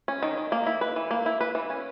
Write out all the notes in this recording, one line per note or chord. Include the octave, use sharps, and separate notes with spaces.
C#4
D#3
D#3
A#3
E4
B4
E3
A#3
E4
B4
E3
C#4